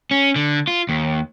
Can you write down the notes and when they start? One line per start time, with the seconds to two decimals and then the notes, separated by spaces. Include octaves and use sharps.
0.11 C#4
0.36 D3
0.67 F4
0.89 D#2